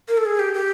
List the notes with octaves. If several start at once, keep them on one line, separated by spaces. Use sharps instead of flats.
A#4
A4
G#4
G4
G4